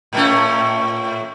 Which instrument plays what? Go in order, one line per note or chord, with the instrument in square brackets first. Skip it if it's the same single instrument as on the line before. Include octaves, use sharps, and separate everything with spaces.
[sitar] A2 A3 C#4